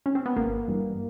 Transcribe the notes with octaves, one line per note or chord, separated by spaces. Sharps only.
C#4
C4
B3
G#1 A#3
G2 E3 G3